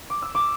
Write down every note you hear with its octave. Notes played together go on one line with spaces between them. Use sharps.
D6
E6
D6